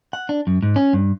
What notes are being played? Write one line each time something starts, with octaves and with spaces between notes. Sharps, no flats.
F#5
D4
F#2
G#2
C#4
G2